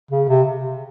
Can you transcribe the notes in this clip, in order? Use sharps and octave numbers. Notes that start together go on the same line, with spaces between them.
C#3
C3